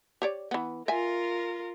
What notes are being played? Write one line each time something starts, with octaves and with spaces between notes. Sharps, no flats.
G4 C#5 D5
E3 B3
F4 A#4 E5 G#5